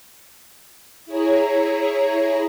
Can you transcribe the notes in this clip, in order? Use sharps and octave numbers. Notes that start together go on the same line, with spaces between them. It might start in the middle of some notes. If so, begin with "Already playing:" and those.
E4 G#4 C#5 A#5